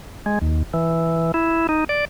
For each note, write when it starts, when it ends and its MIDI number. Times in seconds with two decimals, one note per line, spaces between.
0.26 0.39 56
0.42 0.63 39
0.74 1.32 52
1.34 1.67 64
1.69 1.84 63
1.89 2.05 74